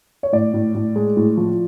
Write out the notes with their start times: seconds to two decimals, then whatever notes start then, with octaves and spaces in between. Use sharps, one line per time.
0.23 C#5
0.33 A2 D5
0.54 A2
0.75 A2
0.96 G#3
1.17 A2
1.37 F3